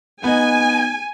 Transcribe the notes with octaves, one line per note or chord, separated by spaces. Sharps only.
B3 D#4 G#5